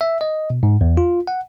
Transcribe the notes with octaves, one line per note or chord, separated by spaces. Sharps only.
E5
D#5
B2
G#2
E2
F4
F#5